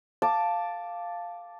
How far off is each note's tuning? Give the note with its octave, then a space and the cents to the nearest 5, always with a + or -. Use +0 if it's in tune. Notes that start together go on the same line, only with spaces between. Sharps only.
F5 +0 A5 +0 D6 +0